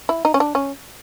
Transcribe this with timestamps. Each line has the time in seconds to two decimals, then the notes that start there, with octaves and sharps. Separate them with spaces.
0.09 E4
0.25 D#4
0.34 C#4
0.40 D4
0.55 C#4